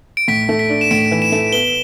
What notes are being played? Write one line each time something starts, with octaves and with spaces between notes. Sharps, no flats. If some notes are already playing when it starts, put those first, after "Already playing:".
D7
A2 B6
A3
B6
D4
E7
A2 D7
E3
E7
A3
B3 G7